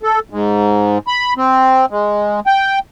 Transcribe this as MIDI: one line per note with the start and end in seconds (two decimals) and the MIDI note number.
0.03 0.19 69
0.30 0.98 44
1.07 1.33 83
1.37 1.86 60
1.90 2.40 56
2.47 2.79 79